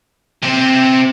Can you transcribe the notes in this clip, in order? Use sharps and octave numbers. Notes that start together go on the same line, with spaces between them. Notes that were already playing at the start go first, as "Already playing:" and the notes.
C3 C4